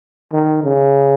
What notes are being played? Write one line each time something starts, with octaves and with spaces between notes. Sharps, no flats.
D#3
C#3